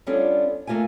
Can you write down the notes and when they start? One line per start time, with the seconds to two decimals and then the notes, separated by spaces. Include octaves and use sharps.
0.07 G3 B3 C#4 D4 F4 A4
0.67 A3 A#3 F4 B4 G#5